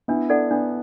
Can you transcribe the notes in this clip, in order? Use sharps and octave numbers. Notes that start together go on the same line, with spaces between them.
B3 D4 E4
D4 A4 D5 F#5
B3 D4